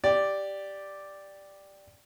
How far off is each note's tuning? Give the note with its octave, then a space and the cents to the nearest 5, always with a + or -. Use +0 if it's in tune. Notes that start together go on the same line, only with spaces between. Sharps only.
G4 +0 D5 +0